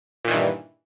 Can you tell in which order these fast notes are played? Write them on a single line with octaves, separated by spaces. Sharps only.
A#2 D#3 E3 G2